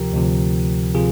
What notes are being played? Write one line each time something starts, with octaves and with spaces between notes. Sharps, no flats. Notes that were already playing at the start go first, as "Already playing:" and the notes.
Already playing: D2 C3 F3 G4 A#4
D2 C3 F3
C3 F3 F4 G#4